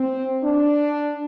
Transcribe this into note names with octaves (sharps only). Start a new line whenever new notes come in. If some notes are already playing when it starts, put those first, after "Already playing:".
Already playing: C4
D4